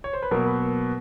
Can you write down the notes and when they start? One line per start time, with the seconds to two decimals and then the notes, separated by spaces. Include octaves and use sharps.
0.04 C#5
0.13 C5
0.22 B4
0.31 B2 F#3 A#3 A#4
0.46 B4